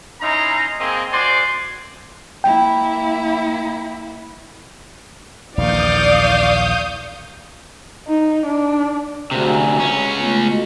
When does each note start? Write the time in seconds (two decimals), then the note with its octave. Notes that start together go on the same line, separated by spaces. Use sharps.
0.22 C#4 D#4 E4 A#5 C6
0.79 A#3 C4 G#4 D#5
1.12 F#4 C5 D5 G#5 C6
2.44 A#3 E4 G5
5.58 A#1 D#2 E3 D5 F5 C#6 D#6 G6
8.08 D#4
8.46 D4
9.31 D2 C3 F#4 G#4 C5
9.44 F#5 G#5 A#5
9.80 C#2 C#4
10.18 A3 B3 F4
10.51 F#4 A4 D#5